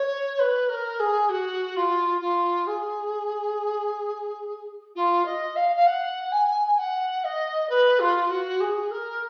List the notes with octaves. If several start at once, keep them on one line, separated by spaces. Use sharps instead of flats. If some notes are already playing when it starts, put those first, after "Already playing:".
Already playing: C#5
B4
A#4
G#4
F#4
F4
F4
G#4
F4
D#5
F5
F5
F#5
G#5
G#5
F#5
D#5
B4
F4
F#4
G#4
A#4